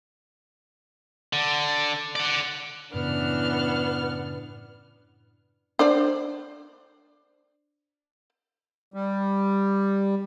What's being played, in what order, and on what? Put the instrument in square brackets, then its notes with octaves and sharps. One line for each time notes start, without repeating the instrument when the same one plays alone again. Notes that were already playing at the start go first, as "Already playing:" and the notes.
[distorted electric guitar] D3
D5 F#5
[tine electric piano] F#2 A2 C#3 [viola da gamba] E3 C#4 D4 [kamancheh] B3 F6
[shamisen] D4 C5 D5
[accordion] G3